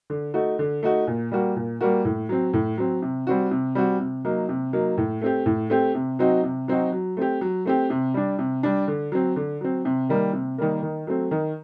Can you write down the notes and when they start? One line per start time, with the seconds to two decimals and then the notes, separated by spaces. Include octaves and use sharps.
0.10 D3
0.34 A3 D#4 F#4
0.59 D3
0.83 A3 D#4 F#4
1.07 A#2
1.31 G3 A#3 F#4
1.56 A#2
1.81 G3 A#3 F#4
2.05 A2
2.29 F#3 C4
2.53 A2
2.78 F#3 C4
3.02 C3
3.27 G3 C4 F#4
3.51 C3
3.75 G3 C4 F#4
4.00 C3
4.25 F#3 A#3 D#4
4.49 C3
4.73 F#3 A#3 D#4
4.98 A2
5.21 A3 C4 G4
5.46 A2
5.70 A3 C4 G4
5.95 C3
6.19 F#3 C4 D#4 F#4
6.43 C3
6.68 F#3 C4 D#4 F#4
6.92 F#3
7.17 A3 C4 G4
7.41 F#3
7.65 A3 C4 G4
7.90 C3
8.14 G3 D4
8.39 C3
8.63 G3 D4
8.88 D3
9.12 F#3 C4
9.36 D3
9.61 F#3 C4
9.85 C3
10.09 D#3 G3 A#3
10.33 C3
10.58 D#3 G3 A#3
10.83 D#3
11.07 F#3 A3 C4
11.31 D#3